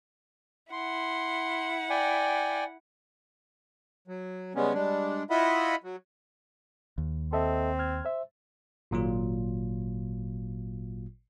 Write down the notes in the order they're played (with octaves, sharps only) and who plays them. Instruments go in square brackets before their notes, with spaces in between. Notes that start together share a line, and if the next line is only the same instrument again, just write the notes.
[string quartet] E4 F#5 [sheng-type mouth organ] C6
[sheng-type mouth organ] D5 G5 G#5
[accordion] F#3
C#3 G3 G#3 B3 C#4
G3 G#3 D4
E4 F4 D#5 E5 F#5 B5
F#3
[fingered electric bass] D#2
[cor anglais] C4 [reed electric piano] A4 D#5 E5
[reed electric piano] F6 G#6
C5 E5
[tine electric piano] G#1 A#2 F#3 F4